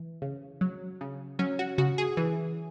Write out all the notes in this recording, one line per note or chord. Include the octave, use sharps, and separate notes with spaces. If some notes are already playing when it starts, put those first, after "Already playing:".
Already playing: E3
C#3
F#3
C#3
F#3 C#4
F#4
C#3 F#4
G#4
E3